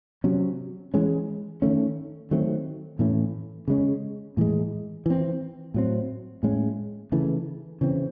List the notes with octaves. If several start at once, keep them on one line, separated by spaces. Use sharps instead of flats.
C3 F#3 C#4
E3 G#3 C#4
D#3 A3 C#4
D#3 F#3 A3 C4
A2 E3 A3 C#4
C#3 G#3 C#4
A2 E3 G#3
E3 C4
A2 F#3 C4
A2 G#3 C#4
C#3 E3 A3
C#3 E3 C4